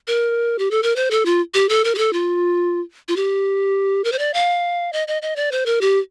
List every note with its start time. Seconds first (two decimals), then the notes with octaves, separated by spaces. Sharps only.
0.07 A#4
0.59 G4
0.71 A4
0.83 A#4
0.96 C5
1.11 A4
1.26 F4
1.54 G4
1.69 A4
1.84 A#4
1.95 G4
1.98 A4
2.13 F4
3.08 F4
3.16 G4
4.04 A#4
4.12 C5
4.19 D5
4.34 F5
4.93 D#5
5.08 D#5
5.22 D#5
5.36 D5
5.52 C5
5.66 A#4
5.81 G4